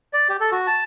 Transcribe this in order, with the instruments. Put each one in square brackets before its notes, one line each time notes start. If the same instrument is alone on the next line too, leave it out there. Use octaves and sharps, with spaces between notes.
[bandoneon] D5
G4
A4
F#4
A5